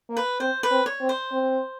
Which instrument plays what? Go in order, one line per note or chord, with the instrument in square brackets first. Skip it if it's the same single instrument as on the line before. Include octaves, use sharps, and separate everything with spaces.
[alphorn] A#3
[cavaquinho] B4
[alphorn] C4 [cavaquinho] C5
[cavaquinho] B4
[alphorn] C4
[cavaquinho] C#5
[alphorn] C4
[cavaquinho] C5
[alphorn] C4